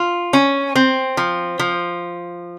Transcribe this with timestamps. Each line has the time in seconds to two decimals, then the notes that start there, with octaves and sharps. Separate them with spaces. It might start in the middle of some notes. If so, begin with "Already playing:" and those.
Already playing: F4
0.33 C#4
0.75 C4
1.17 F3
1.59 F3